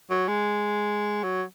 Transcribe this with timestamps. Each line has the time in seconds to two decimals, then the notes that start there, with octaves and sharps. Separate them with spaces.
0.10 F#3
0.28 G#3
1.23 F#3